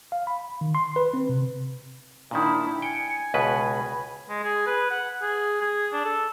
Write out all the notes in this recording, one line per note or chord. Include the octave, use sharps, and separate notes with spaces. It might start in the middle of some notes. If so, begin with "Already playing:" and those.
F5
B5
D#3
C6
B4
C4
C3
A#2 D#3 D4 E4
G5 G#5 C#7
C#2 B2 B4 B5
G#3
G#4
B4
F#5
G#4
G#4
D4
A4